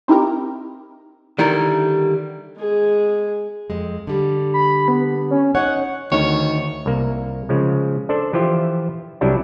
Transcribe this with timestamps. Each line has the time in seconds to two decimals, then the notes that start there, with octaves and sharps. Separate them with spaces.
0.08 C4 D#4 E4 G4 A#4
1.39 D3 D#3 G3 E4 A#4
2.57 G#3 G#4
3.70 F2 G#3
4.07 D3 G3
4.54 B5
4.88 B3
5.31 C#4
5.55 D#4 C#5 F#5
6.12 D2 D#3 C#5
6.86 C2 A#3
7.49 C#3 F3 G#3
8.09 D4 A4 C5 D5
8.33 E3 F3 F4 G4 C5 E5
9.21 C2 F#3 G3 D4 E4